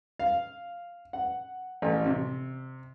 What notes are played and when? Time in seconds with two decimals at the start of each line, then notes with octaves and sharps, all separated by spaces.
0.19 F5
1.13 F#5
1.82 A1
2.06 C3